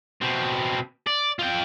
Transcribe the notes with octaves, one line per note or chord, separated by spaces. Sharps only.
B2 C4
D5
F4 G5